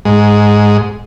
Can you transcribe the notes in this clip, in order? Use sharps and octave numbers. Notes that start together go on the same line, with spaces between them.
G#2